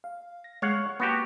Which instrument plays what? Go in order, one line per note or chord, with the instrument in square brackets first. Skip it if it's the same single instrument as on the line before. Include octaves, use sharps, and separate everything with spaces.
[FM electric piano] F5
A#6
[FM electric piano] G#3 [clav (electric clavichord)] C#5 F5 F#5
[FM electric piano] A#3 A5 C#6 [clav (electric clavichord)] B3 F#4 G4